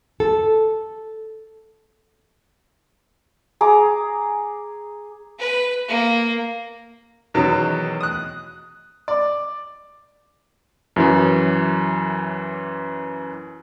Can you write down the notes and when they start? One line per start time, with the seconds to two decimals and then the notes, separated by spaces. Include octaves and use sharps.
0.20 A4
3.61 G#4 A#5 D6
5.39 B4
5.88 A#3
7.34 E2 B2 D#3 F#3
8.01 D#6 F#6
9.08 D5
10.96 F#2 E3 F#3